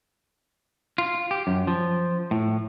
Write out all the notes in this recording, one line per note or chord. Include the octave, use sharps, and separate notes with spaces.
F4
G4
F#2
F3
A2